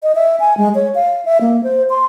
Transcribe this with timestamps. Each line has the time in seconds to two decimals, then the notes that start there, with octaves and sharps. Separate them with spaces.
0.03 D#5
0.15 E5
0.40 G#5
0.57 G#3
0.75 C#5
0.95 F5
1.25 E5
1.41 A#3
1.64 C5
1.90 C6